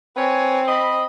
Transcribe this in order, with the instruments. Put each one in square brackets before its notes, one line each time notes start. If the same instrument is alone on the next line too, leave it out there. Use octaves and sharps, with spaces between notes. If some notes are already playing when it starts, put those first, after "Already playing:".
[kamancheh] C4 [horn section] B4 C#5 G#5
[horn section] D#5 B5